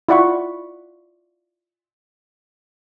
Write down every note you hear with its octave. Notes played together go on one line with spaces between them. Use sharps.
E4 F4 D5 F#5 B5 C#6